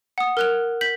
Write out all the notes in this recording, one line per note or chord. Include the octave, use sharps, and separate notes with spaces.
F#5 D#6
A#4 F#6 F7
G6 B6 F#7